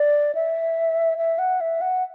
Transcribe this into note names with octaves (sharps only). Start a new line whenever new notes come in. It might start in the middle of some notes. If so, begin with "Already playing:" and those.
Already playing: D5
E5
E5
F#5
E5
F#5